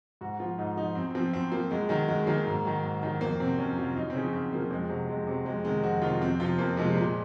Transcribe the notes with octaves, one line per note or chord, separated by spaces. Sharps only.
G#2 F#4
F3 F4
G#2 D#4
F3 D#4
F#2 C4
F3 C4
F#2 C4
F3 A#3
F#2 G#3
D#3 F#3
F#2 G#3
D#3 F#3 A#3
G#2
D#3 F#3
G#2
D#3 F#3
F2 A#3
C3 F#3 C4
F2 C#4
C3 F#3 F4
F#2 D#4
C4
C#3 F3 C#4
F#2 C4
C#3 F3 A#3
F2 G#3
C3 F#3
F2 G#3
C3 F#3
F2 G#3
C3 D#3 F#3 G#3
F2 F#4
C3 D#3 F#3 F4
F2 C4
C3 F3 F4
F2 A#3
C3 F3 G#3
A#2